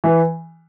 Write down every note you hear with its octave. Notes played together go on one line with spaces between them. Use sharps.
E3